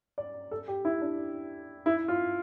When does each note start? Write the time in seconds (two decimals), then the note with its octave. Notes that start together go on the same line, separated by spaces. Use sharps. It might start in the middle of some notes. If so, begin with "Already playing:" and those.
0.18 D5
0.51 A4
0.68 G4
0.85 E4
1.02 D4
1.86 E4
2.08 F4